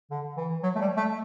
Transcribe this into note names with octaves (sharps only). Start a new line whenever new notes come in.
D3
E3
F#3
A3
G3
A3